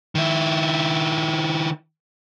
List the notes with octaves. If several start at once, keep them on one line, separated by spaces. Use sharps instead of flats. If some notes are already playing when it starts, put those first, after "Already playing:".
D#3 E4